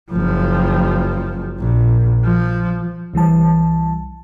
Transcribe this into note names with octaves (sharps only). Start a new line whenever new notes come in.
F#1 F3
A#1
F3
C2 E3 G3 A5